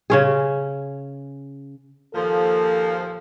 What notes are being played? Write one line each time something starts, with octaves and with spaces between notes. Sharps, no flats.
C#3 C#4 G#4
D#2 A#2 F3 A4